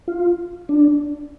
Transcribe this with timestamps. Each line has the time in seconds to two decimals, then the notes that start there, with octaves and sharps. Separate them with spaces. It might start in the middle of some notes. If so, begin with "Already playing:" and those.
0.08 F4
0.69 D4